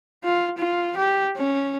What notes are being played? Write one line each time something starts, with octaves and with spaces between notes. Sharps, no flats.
F4
F4
G4
C#4